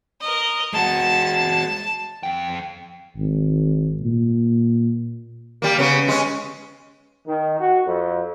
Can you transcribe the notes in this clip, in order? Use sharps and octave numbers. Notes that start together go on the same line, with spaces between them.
A#4 D#5
G#3 F#4 A5
F2 G5
G#1
A#2
G3 A#3
C#3 B3
G#3 C#4
D#3
F#4
F2